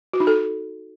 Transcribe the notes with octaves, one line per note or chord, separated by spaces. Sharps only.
F#4
D#4
A4